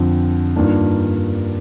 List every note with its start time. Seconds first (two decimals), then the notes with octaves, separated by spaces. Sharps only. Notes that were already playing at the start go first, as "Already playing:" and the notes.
Already playing: F2 D3 F3 C4
0.56 G2 D#3 A#3 D4 F4